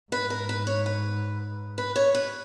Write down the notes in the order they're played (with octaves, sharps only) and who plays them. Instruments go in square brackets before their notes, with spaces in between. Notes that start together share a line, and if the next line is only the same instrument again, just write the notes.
[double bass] G#2 [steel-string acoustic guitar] B4
[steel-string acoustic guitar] A#4
B4
C#5
B4
B4
C#5
B4